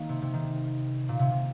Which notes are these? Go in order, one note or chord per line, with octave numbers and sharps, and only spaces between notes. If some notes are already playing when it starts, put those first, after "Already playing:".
Already playing: D#3 A#3 C4
C3
C3
D#3
A#2
C3
C3